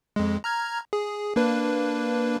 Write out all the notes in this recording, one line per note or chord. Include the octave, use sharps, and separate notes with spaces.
F2 G#3
A#5 F6 G#6
G#4
A#3 D4 B4